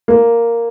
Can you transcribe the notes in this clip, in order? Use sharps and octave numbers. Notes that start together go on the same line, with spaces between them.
A#3